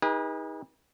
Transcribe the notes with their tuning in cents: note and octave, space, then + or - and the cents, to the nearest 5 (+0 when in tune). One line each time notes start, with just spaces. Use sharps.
D#4 +25 G#4 -35 B4 -35